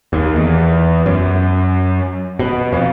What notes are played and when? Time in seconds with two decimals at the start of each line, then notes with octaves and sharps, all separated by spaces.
0.13 D#2
0.36 E2
1.06 F#2
2.39 B2
2.73 F2